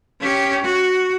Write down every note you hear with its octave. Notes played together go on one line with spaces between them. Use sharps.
C#4 G4
F#4